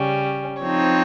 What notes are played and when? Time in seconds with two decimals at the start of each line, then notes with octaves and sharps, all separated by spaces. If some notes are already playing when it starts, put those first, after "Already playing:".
Already playing: C#3 G3 C#4
0.62 F3 C4 D#4 C#5